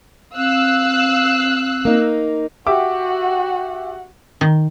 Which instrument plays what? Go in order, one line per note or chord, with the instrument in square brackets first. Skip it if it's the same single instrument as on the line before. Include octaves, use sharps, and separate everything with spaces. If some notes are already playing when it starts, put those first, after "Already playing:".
[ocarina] C4 [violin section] F5 E6 F#6
[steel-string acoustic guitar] A#3 D#4
[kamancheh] F#4 F#5 [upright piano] G4 E5 D6
[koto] D#3